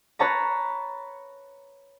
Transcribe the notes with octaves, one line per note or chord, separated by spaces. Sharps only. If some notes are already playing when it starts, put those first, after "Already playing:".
B4 C#5 A5 A#5